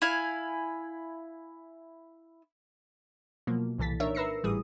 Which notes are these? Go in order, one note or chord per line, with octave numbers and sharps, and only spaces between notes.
E4 F5 G#5
B2 F3 F#3 A#3
C2 A#2 E3 A4 A6 B6
D4 D#4 A#4 C#5 E5
A#4 B4 E6 A#6 C7 C#7
G#1 A2 E3 G3 G#4 D#6